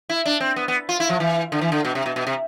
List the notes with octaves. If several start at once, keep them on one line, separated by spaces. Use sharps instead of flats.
E4
D4
C4
B3
B3
F4
E4
F3
E3
D3
E3
D3
B2
C3
B2
B2
C3